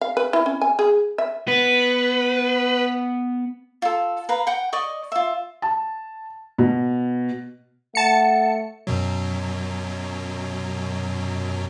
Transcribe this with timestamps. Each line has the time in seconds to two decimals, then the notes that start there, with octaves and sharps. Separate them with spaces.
0.01 F5
0.17 B4
0.33 E4
0.46 C#4
0.61 G#5
0.79 G#4
1.18 E5
1.48 B3 B4
3.82 F4 A4
4.29 B4 F5 A#5
4.47 F#5 G5
4.73 D5 D#5 C#6
5.12 F4 E5
5.62 A5
6.58 B2
7.95 A3 F#5 A5 C#7
8.87 F#2 B2 F#3